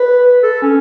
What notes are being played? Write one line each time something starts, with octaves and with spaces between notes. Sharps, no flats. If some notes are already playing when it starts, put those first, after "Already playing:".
Already playing: B4
A4
C#4